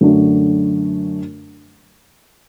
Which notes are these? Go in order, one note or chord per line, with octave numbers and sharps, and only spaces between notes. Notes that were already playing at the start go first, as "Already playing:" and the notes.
F#2 D3 F#3 A3 D4